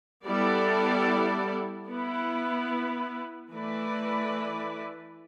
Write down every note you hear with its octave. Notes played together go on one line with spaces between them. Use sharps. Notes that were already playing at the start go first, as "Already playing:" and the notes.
G3 B3 E4 A4 D5
B3 E4 B4
E3 A3 E4 B4 D5